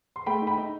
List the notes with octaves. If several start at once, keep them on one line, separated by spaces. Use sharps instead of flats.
C6
A3 G5 B5
D#4
G5 B5
D#4